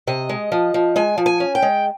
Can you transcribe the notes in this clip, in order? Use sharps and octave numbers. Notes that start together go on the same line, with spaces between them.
C3 D#5
G#3
F3
F3
G#3 G#5
F3
G#5
C#4
G5
G#3